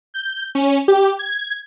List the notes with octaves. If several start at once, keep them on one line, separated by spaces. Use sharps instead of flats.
G6
C#4
G4
G#6